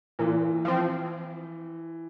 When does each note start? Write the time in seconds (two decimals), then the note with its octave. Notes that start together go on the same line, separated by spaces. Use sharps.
0.19 A#2 E3
0.65 F3 C4